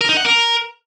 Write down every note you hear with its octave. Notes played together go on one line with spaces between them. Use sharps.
A#4
D#4
F#5
A#4